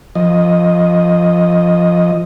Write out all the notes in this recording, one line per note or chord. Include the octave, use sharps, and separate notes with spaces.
F3 D#5